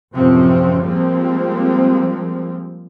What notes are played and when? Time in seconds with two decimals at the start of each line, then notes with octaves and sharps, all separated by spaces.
0.14 A1 F#2 C3 F3 C4 C#4
0.81 F3 G3 G#3 A#3 C4